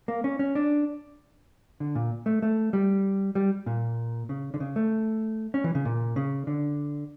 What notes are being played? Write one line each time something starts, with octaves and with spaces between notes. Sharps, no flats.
A#3
C#4
C#4
D4
D3
A#2
A3
A3
G3
G3
A#2
C#3
D3
C#3
A3
C#4
E3
C#3
A#2
C#3
D3